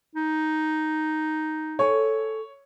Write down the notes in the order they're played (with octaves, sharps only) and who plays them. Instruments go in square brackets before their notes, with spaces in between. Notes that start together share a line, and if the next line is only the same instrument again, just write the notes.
[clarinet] D#4
[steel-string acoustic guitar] A4 G#5 [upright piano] C#5 C#6